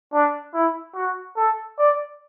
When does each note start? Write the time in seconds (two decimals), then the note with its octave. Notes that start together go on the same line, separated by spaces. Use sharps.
0.12 D4
0.54 E4
0.95 F#4
1.37 A4
1.78 D5